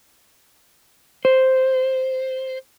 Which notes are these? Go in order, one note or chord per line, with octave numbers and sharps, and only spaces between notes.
C5